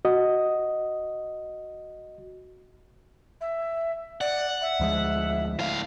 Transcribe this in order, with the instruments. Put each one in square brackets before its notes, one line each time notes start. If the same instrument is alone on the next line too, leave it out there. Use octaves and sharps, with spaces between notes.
[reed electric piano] F#4 D#5
[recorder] E5
[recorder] D5 [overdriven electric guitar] F#5
[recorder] E5
[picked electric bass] D2 F3 G#3
[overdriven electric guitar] A2 F5